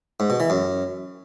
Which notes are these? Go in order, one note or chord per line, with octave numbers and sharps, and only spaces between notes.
G#2
B2
E3
F#2